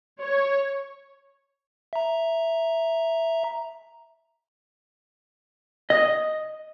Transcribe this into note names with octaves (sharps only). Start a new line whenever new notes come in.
C#5
E5 A#5
D#5